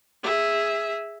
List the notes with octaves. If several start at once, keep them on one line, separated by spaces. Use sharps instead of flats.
G#4 E5